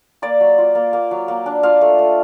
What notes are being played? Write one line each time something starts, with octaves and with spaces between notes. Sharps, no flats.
A#3 D5
F#3
F4
A#3
A#3
F#3
A#3
D4
F4 F5
A3
A3